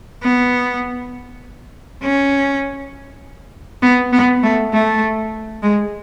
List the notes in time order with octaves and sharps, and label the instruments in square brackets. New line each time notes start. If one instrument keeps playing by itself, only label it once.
[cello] B3
C#4
B3
B3
A3
A3
G#3